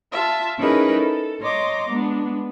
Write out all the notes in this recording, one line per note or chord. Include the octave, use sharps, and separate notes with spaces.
F4 E5 A5
C#4 D#4 E4 G#4 A#4 B4
A4
C#5 D#5 A#5 C6 D6
G#3 B3 D4